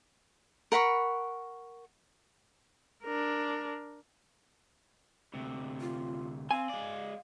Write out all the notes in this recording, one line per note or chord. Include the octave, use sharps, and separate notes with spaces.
A#4 F#5 B5 C#6
D4 A#4
D2 C3
F4
C4 F5 G#5
G#3 D5